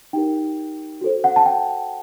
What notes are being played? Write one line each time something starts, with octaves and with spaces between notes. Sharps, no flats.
D#4 G4 A#4 G5
F#4 A4 C5
F#5
A5
G5